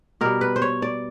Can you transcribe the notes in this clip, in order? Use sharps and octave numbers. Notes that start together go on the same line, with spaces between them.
B2 G3 A#4
B4
C5
C#5
D5